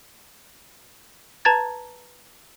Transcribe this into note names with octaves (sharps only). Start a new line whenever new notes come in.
B4 A5 A#5 G#6 A6